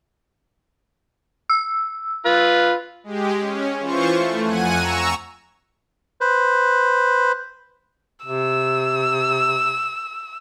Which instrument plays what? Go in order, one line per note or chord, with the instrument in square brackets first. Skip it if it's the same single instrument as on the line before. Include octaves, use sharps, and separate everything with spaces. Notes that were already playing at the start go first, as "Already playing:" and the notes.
[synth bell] E6
[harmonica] F4 B4
[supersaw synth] G#3 G4
C#4
E3 F4 C5 C#6
A3
F2 F#5 G#5 D#7
A#5 C#6 E6
[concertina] B4 C5
[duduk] C3 [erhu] E6